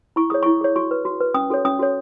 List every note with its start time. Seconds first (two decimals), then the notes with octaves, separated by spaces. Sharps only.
0.16 E4 C#6
0.30 G#4 C#5 D#6
0.43 E4 C#6
0.61 G#4 C#5
0.76 F#4 C#6
0.91 B4
1.05 F#4
1.21 B4
1.34 C#4 D#6
1.50 F#4 A4 C#5
1.65 C#4 D#6
1.79 F#4 A4 C#5